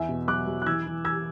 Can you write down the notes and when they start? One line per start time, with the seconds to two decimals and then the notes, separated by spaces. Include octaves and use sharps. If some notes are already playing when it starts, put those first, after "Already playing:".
Already playing: E2 E5 G#5
0.09 B2
0.27 F#3 D6 F#6
0.47 F#3
0.62 F#6
0.66 E3 E6 G#6
0.86 E3
1.05 E3 E6 G#6